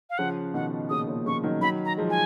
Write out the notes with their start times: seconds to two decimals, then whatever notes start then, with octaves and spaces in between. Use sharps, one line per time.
0.10 F5
0.18 C#3 F3 F#5
0.54 B2 D#3 F#5
0.90 A#2 C#3 D#6
1.08 A#2 C#3
1.26 C#3 F3 C#6
1.44 D#3 F#3
1.61 D#3 F#3 B5
1.85 A#5
1.98 F3 G#3
2.10 G#5